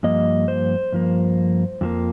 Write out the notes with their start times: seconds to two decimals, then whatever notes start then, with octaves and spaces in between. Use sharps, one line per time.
0.03 G2 F3 A#3 D#5
0.48 C5
0.92 G2 F3 A#3
1.81 F2 F3 A#3